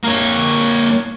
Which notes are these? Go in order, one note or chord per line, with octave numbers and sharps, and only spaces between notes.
A#3 C#5